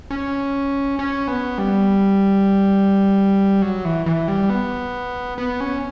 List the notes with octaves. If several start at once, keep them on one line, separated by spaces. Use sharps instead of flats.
C#4
C#4
B3
G3
F#3
E3
E3
G3
B3
B3
C#4